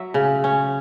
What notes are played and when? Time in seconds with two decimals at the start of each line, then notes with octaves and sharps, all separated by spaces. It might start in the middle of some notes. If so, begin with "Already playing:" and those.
Already playing: F#3 E5
0.14 C#3
0.44 C#4